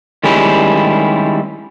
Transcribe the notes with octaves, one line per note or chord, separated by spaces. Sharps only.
D#3 G3 G#3 C#4 E4 G4